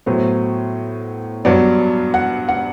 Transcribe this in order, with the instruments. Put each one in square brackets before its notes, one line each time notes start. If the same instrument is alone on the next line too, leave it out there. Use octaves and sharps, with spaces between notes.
[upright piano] A2 F#3 B3 C5
G2 F#3 B3 D5
F#5
F#5